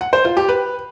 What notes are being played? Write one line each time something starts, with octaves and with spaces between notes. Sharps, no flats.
F#5
C5
F4
G4
B4